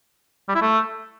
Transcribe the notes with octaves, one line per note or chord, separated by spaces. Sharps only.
G3
E4
A3